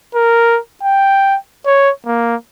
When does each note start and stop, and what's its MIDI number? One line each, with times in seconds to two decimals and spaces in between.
0.15 0.59 70
0.83 1.37 79
1.66 1.90 73
2.06 2.35 58